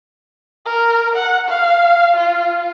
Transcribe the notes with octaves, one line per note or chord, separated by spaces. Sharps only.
A#4
F#5
F5
F4